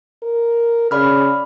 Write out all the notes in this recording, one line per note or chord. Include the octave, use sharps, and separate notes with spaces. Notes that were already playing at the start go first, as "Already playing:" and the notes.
A#4
C#3 D5 B5 F6